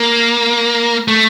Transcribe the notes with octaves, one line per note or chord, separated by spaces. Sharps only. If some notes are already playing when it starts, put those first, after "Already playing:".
Already playing: A#3
A3